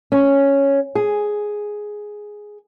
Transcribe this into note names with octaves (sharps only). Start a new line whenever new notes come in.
C#4
G#4